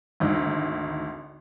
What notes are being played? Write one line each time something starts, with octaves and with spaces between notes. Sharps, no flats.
G#1 D2 D#4